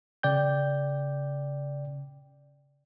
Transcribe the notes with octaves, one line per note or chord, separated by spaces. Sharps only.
C#3 D5 G5 G6